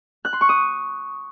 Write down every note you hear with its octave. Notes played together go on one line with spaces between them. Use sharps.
F#6
C6
C#6
D#6